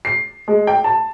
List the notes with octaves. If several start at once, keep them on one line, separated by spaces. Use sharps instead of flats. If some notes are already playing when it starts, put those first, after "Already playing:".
C7
G#3
G5
A5